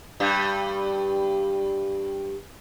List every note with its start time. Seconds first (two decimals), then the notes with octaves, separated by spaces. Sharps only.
0.20 G2 G3